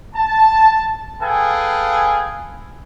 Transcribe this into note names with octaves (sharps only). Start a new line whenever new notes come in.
A5
G#4 A4 B4 F5 G5 G#5